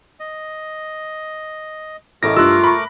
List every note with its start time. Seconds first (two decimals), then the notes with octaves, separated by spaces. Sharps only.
0.20 D#5
2.23 A1 A3 E4 A4 A#4 D#5 D6 A#6
2.37 G2 G3 F4 E6 F#6
2.64 A#5 B5 C#6